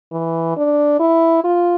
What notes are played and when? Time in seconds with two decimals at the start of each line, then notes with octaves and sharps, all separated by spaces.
0.12 E3
0.56 D4
1.00 E4
1.44 F4